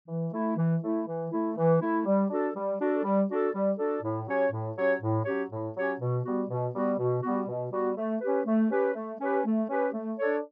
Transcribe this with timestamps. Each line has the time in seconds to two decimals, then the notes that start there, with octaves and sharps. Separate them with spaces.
0.08 E3
0.33 A3 E4
0.57 E3
0.83 A3 E4
1.07 E3
1.32 A3 E4
1.56 E3
1.81 A3 E4
2.06 G3
2.29 D4 F#4 A4
2.55 G3
2.79 D4 F#4 A4
3.03 G3
3.29 D4 F#4 A4
3.53 G3
3.78 D4 F#4 A4
4.02 A2
4.27 F#3 C#4 G4 C#5
4.52 A2
4.76 F#3 C#4 G4 C#5
5.02 A2
5.25 F#3 C#4 G4 C#5
5.51 A2
5.75 F#3 C#4 G4 C#5
6.00 B2
6.25 G3 B3 F#4
6.49 B2
6.74 G3 B3 F#4
6.99 B2
7.22 G3 B3 F#4
7.47 B2
7.71 G3 B3 F#4
7.97 A3
8.21 C#4 G4 B4
8.46 A3
8.70 C#4 G4 B4
8.94 A3
9.20 C#4 G4 B4
9.45 A3
9.69 C#4 G4 B4
9.93 A3
10.18 D4 A4 C#5